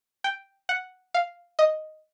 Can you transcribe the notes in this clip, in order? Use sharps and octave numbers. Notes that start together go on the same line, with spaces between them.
G5
F#5
F5
D#5